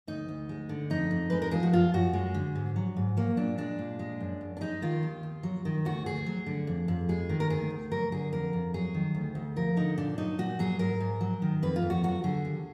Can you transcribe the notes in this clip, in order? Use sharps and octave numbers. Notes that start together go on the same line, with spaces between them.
D2 D#4
D2
G#3
D3
F2 D#4
F2
G#3 B4
A#4
F3 G#4
F#4
F#2 F4
F#2 F#4
G#3
D3
G#2
F#3
G#2
F#3 A#3
A#2 D4
G#3 D4
A#2
G#3
F#2
F#2
D4
G#3 D#4
D#3 F4
D#2
D#2
F#3
D#3
D2 F#4
D2 G#4
F#3
D3
F2
F2
G#3 G#4
D#3
A#4
D2 G#4
D2
F#3 A#4
D3 G#4
F2 A#4
F2
F#3 G#4
D#3
D2
D2
F3 A#4
D3 D#4
A#2 D4
F#3 D#4
A#2 F#4
F#3 G#4
G#2 A#4
G#2
F#3
D#3
F2 B4
F4
F2
F#4
F#3 F#4
D3 G#4
D#2